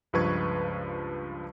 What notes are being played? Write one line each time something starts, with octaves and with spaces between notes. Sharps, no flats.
C#2 G2 F3 B4 C#6 G#6